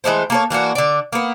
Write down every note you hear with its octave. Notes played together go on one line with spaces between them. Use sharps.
E3 G#3 A3 C5
A#3 A4 C#5
E3 A#3 D4 F#4
D3 D5
A#3 B3